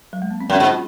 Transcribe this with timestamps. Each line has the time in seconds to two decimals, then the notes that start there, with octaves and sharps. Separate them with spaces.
0.13 F#3
0.22 G#3
0.31 A#3
0.41 C4
0.50 F#2 C#4
0.59 G#2 F#4
0.70 F4